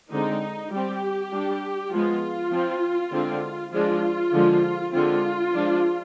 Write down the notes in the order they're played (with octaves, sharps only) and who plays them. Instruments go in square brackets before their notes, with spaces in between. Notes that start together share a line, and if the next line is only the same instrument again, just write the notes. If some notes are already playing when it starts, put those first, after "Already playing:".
[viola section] D3 G#3 C4 D#4
G3 C4 G4
G3 D4
F3 G#3 B3 F4
F3 C4
D3 G#3 C4
F3 G#3 D4 F4
D3 F3 G#3
D3 G#3 C4 F4
F3 G#3 D4